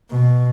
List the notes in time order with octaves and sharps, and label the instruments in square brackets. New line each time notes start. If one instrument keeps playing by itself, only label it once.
[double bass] B2